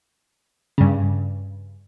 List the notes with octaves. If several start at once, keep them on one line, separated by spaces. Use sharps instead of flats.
G2 C#3